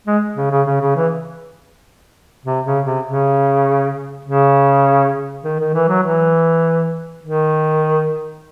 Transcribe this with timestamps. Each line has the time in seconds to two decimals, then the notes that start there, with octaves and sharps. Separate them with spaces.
0.07 G#3
0.37 C#3
0.51 C#3
0.66 C#3
0.81 C#3
0.96 E3
2.45 C3
2.66 C#3
2.85 C3
3.05 C#3
4.25 C#3
5.44 D#3
5.59 D#3
5.74 E3
5.89 F#3
6.03 E3
7.23 D#3